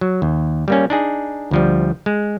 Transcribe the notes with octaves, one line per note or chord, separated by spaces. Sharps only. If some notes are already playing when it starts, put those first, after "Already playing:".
F#3
D#2
G3 A#3 C#4
D4 D#4 G#4
D2 F3 G3
G#3